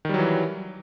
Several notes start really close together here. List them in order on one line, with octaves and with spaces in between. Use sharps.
D#3 G3 F#3 E3